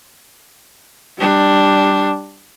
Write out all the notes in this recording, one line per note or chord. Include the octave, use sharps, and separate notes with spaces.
G3 D4